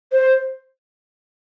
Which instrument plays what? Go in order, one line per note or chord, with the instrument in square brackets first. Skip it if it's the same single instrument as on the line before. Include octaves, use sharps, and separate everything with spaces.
[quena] C5